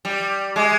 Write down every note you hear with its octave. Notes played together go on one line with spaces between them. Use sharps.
G3
G#3